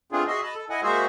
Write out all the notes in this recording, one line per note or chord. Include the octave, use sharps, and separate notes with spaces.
A3 B3 C4 D4 F4 G#4
F#4 G#4 D#5 E5 C6
D#5 A5 B5
A4
E4 D#5 F#5 G#5
G#3 A#3 F#4 G#4 C5 E5